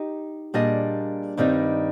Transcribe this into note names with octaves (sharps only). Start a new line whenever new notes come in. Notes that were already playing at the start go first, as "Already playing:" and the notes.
Already playing: D#4 G4
A#2 G3 D4 G#4 D#5
G2 D#3 G3 C4 D#4